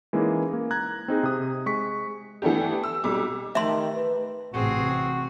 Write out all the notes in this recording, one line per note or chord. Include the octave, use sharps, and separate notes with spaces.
E3 G#3 A#3 C#4 D#4 G#4
A#3
A#5 F#6 G#6
C4 D#4 G#4
C3 D#6
G#3 C#6 B6
E3 A3 B3 D4 G4
E6
B1 G3 D6
D#3 A3 G4 E5 A5 C6
B4
A1 C3 C4 F#4 G#4